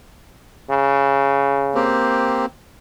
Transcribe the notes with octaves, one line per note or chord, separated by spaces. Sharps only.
C#3
A#3 C4 G4